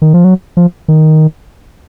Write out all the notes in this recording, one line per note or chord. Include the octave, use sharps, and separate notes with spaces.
D#3
F3
F#3
F3
D#3